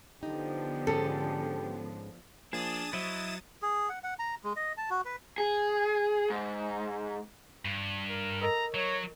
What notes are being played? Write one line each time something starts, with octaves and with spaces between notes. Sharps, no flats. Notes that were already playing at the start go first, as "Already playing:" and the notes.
D3 F3 B3 D#4 G4
G#2 C#4 G#4 A4
F3 A#3 D4 G#4 D#6 A6 E7
F#3 E4 C5 D#5 E5
G#4
F#5
F#5
A#5
G#3
D#5
A5
F#4
B4
G#4
G#2
G2
A#4
A4 A#4 D#5 A#5
F#3 C#5